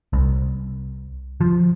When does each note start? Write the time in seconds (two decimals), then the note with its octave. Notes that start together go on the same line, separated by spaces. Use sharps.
0.13 C2
1.41 F3